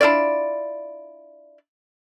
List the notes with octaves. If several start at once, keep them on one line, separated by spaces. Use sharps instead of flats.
D4 E4 F4 D5